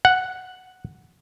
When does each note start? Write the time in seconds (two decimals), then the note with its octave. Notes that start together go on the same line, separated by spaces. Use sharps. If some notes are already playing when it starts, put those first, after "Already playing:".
0.05 F#5